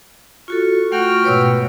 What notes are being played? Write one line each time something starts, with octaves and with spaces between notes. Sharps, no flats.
F4 F#4 A4 C#6
A3 F4 F#4 F#5 G5 F6
G#2 B2 B4 C#5 E6